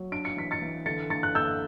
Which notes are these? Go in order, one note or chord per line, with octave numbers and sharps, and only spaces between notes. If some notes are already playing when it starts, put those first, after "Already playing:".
Already playing: F#3
D4 D7
C#7
E3 B6
A6 C#7
E3
D3 A6 C#7
D3 A6 C#7
F#6
D3 E6 G6